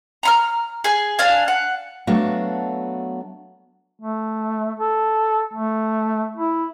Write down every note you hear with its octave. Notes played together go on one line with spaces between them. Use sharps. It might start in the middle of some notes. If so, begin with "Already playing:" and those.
A#5 B5 F6
G#4 G#5
D4 F5 G#5
F#5
F#3 A3 B3 D4 F#4 F5
A3
A4
A3
E4